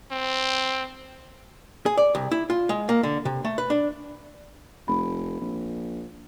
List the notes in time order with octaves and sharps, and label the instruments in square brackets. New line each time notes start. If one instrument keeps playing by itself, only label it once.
[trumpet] C4
[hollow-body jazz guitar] G#4
D5
C2
E4
F4
G#3
A#3
D3
C3
A3
B4
D4
[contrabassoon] F1 [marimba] B5
[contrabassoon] A#1